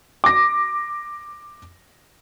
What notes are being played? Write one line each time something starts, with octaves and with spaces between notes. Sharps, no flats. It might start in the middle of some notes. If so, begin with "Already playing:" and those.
D6 A#6